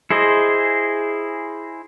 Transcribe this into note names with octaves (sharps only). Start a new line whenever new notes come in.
E4 G#4 C5 D#5